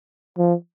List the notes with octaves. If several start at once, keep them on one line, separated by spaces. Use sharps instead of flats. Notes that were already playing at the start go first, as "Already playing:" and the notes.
F3